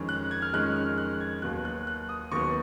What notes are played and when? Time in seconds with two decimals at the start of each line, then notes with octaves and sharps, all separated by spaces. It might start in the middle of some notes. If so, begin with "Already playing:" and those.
Already playing: F2 D#3 G#3 C#4
0.09 F#6
0.31 G#6
0.42 F6
0.53 F2 D#3 G#3 C#4 F#6
0.76 F6
0.98 F#6
1.20 G#6
1.42 D#2 D#3 F#3 B3 F#6
1.65 F#6
1.87 F#6
2.09 D#6
2.32 D#2 D#3 F#3 B3 C#6